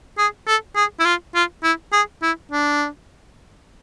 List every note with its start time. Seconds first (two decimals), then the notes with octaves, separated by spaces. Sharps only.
0.18 G#4
0.47 A4
0.76 G#4
1.00 E4
1.05 F4
1.35 F4
1.64 E4
1.93 G#4
2.22 E4
2.51 D4